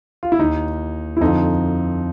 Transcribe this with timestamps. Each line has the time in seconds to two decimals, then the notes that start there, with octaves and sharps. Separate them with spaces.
0.23 F4
0.32 E4
0.39 D#2 D#3 D#4
1.17 E4
1.21 F2 D3 F3 D#4